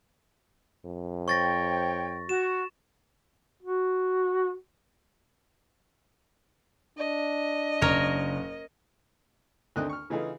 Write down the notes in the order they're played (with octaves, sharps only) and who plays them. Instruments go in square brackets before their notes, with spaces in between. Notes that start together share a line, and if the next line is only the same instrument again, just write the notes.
[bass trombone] F2
[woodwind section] C5 C#5 G5 [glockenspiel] C#6 A6 A#6
[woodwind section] F#4 [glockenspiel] E7
[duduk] F#4
[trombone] D4 [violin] D#5
[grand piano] F#1 [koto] A#4 C#5
[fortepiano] D2 D#3 A3 C4 D#5 F#6
C#6 F6
C#3 E3 A3 D#4 F4 G#4